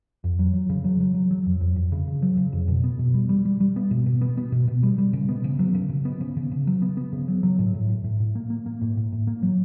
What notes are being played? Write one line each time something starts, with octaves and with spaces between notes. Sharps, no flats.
F2
F#3
F#3
C#3
F#3
F#3
F#3
F#3
F2
F2
F2
C#3
C#3
F#3
C#3
F2
B2
B3
B2
G3
G3
G3
G3
B3
B2
B2
B3
B3
B2
B2
G3
G3
C#3
B3
C#3
F#3
C#3
C#3
B3
C#3
C#3
C#3
F#3
B3
B3
C#3
F#3
F#3
A2
A2
A2
A2
A2
A#3
A#3
A#3
A2
A2
A2
A#3
F#3